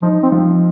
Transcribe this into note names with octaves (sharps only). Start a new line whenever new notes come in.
F3 D#4
C4
F3